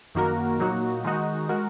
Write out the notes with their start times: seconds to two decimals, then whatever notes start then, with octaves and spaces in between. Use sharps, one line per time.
0.15 F#2 D#3 A#3 F#4 A#4
0.60 A#2 F#3 A#3 D#4 F#4
1.04 D#3 G#3 D#4 F#4
1.49 G#3 F#4 A#4